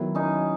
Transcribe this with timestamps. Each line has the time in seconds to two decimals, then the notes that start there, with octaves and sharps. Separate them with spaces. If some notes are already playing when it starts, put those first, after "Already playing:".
Already playing: D#3 F#3 B3 E4
0.15 C#4 D#4